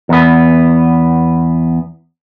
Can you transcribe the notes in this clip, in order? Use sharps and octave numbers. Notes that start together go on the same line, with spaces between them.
E2 B3